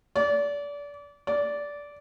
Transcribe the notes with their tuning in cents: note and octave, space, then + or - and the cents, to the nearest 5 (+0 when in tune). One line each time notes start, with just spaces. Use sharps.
D5 -30
D5 -15